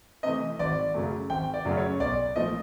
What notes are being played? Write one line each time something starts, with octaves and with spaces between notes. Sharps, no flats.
C3 E3 A3 D#5
G#1 D5
F#2 C#3 F#3 A3
G#1 G5
D5
F#2 C#3 F#3 A3
C#5
B1 D5
A#2 F3 A3 D#5